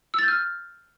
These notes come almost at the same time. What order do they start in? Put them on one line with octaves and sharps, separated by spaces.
E6 A6 G6 F6